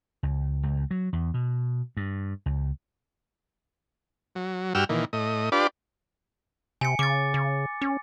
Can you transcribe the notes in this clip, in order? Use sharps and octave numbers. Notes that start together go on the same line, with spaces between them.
C#2
C#2
F#3
E2
B2
G2
C#2
F#3
G2 F#4 G5 E6 F6
A#2 D#3 E3
A2 D#5
D4 F4 G4 B4 D5
C3 G#5 C#7
C#3 D6 A6
C#3
C#4